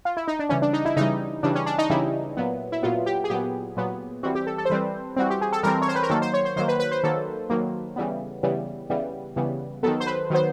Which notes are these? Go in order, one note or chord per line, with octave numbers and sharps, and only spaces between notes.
F4
E4
D#4
D4
C#3 E3 G3 C#4
D4
D#4
E4
C#3 E3 G3 D#4
C#3 E3 G3 D4
C#4
D4
D#4
C#3 E3 G3 E4
A#2 F#3 B3
E4
A#2 F#3 B3 F4
G4
G#4
A#2 F#3 B3 G4
A#2 F#3 B3
E3 G3 C4 F#4
G4
A4
A4
C5
E3 G3 C4 B4
E3 G3 C4 F#4
G4
G#4
A4
E3 G3 C4 A#4
C#5
C5
B4
A#4
D#3 F#3 A#3 A4
C5
C#5
C5
D#3 F#3 A#3 C5
B4
B4
C5
D#3 F#3 A#3 A4
D#3 F#3 A#3
C#3 E3 G3 B3
C#3 E3 G3 B3
C#3 E3 G3 B3
C#3 E3 G3 B3
D#3 F#3 B3 A4
C5
B4
D#3 F#3 B3 C5